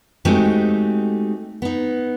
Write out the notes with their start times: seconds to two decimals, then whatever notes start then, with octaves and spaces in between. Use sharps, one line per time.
0.25 G#3 A3 C4 D#4 F#4 G4
1.62 B3 D#4